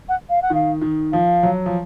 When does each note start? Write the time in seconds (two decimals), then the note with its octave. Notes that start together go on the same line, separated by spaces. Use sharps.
0.09 F#5
0.30 F5
0.42 F#5
0.50 D#3 F5
0.81 D#3
1.12 F3 F5
1.43 F#3
1.66 F3